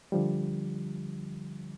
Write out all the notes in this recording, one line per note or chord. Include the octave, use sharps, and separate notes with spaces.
D3 F3 G3